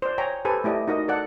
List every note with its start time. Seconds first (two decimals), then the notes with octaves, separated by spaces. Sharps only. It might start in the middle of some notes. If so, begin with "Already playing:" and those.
0.02 C5 D5
0.18 C#5 G5 G#5 A#5
0.45 G4 A4 B4 C5 G#5
0.64 A3 E4 G4 D5 D#5
0.88 D#4 F#4 A#4 D#5
1.08 A4 D5 F#5